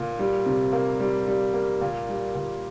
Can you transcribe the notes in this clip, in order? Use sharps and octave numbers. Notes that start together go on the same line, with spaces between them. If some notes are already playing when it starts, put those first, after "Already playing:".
Already playing: A#2
G3
C3
A#3
G3
G3
A#3
A#2
G3
A#2